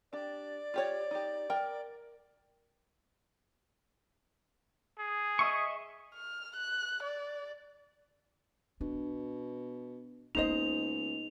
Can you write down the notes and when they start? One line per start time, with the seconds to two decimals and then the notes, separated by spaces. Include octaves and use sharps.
0.13 D4 G4 D5
0.74 F4 G4 C#5
1.11 D#4 G4
1.50 A#4 G5
4.99 G#4
5.39 D#5 E5 C#6
6.15 F6
6.56 F#6
7.03 D5
8.81 B2 D4
10.35 C#2 A#3 B3 D#4 C5 D#5 F7